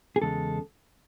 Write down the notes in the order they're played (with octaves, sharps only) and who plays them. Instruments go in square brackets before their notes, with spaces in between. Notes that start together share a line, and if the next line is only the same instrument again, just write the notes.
[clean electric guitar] G#4
E2 C#3 G#3 A4